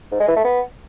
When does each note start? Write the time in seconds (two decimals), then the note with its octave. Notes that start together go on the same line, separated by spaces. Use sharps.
0.12 G#2
0.20 G#3
0.28 E3
0.36 A3
0.44 B3